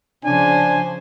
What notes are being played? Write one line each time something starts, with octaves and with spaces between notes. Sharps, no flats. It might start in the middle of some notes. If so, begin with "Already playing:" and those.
C#3 F3 D4 C5 G#5